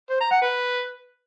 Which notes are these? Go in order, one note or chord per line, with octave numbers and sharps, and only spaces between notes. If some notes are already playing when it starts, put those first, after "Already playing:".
C5
A#5
F#5
B4